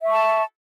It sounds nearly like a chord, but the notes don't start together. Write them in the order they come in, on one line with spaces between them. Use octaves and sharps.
E5 C#6 A5